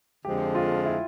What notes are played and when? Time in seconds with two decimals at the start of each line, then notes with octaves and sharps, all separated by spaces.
0.25 F2 D3 F3 G#3 G4
0.55 F4
0.86 E4